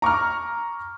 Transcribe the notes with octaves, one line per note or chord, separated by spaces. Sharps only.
A#5 C#6 D6 F6